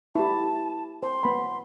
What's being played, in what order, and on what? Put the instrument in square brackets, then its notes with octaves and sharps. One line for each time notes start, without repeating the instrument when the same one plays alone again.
[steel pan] E4 G4 [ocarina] A5
[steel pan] C5 [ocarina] C6
[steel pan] B3 B5